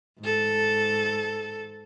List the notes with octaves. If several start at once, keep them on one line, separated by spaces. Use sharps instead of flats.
G#2 A4